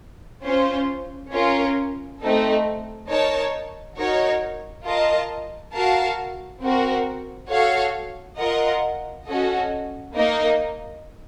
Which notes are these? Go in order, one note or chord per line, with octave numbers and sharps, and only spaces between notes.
C#4 F4 C5
C#4 F4 A#4
A3 C4 D#4 A4
D#4 A#4 C#5 A5
D#4 F#4 A#4 C#5
F4 A#4 D#5 A5
F#4 A#4 F5 A5
C4 F#4 A#4
F#4 A4 C#5 F5
F4 A#4 D#5 F#5
C#4 F#4 A4 D#5
A#3 D#4 A#4 D#5